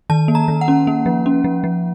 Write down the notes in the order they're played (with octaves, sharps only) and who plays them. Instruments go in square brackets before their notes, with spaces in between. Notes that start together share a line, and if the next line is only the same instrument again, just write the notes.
[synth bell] D#3 A5
A#3
A#5
D#3
F#5
C#4
A#3
F3
C#4
F3
F3